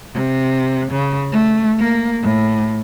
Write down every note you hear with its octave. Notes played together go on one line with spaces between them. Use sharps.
C3
C#3
A3
A#3
A2